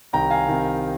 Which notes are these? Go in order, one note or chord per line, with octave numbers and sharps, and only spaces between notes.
C2 C3 D#3 G5 A#5
F5 G#5
C2 C3 D#3